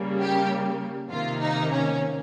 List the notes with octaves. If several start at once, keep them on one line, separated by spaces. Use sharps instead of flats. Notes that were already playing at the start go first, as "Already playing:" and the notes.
Already playing: C#3 G3 A#3
G4
C3 D#3 A#3 F4
D#4
C#4